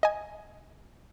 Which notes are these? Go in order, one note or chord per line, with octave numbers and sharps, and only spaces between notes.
D#5 G#5